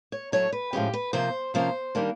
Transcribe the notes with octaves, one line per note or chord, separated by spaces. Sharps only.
C#5
A2 F#3 A3 C#5
B4
A2 F3 G#3 C#4 G4
B4
C3 F3 A#3 C5
C3 F3 A#3 C#4 C5
D#3 G3 A#3 D4